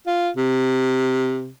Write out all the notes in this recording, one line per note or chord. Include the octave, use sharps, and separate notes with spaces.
F4
C3